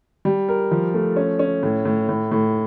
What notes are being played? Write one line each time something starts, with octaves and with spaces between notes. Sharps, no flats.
G3
A#4
F3
A3
C#4
C#4
A2
A2
A2
A2